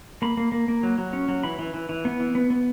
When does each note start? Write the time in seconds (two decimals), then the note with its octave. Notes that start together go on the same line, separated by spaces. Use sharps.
0.22 A#3 B5
0.37 A#3
0.52 A#3
0.68 A#3
0.83 F#3
0.98 F#3
1.13 C#4
1.28 F#3
1.43 E3 B5
1.59 E3
1.74 E3
1.89 E3
2.05 B3
2.20 E3
2.35 B3
2.50 B3